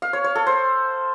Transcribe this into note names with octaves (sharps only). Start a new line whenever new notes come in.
F5
C#5
C#5
A4
C5